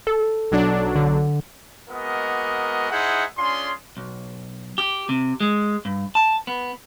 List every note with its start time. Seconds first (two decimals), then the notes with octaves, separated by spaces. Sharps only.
0.07 A4
0.51 B1 F#3 D4
0.96 D3
1.90 G#3 A#3 B3 F#4 A#4 D#5
2.91 D#4 E4 G#4 C5 E5 F#5
3.38 C#4 D4 F4 G#4 C6
3.97 B1
4.78 G4
5.09 C3
5.40 G#3
5.85 G2
6.15 A5
6.47 B3